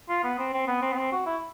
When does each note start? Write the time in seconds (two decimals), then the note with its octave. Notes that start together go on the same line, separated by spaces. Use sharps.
0.09 F4
0.24 B3
0.39 C4
0.54 C4
0.68 B3
0.82 C4
0.93 B3
0.97 C4
1.12 F#4
1.26 E4